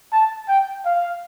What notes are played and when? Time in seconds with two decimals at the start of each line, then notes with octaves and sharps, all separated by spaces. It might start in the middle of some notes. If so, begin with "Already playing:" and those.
0.13 A5
0.48 G5
0.85 F5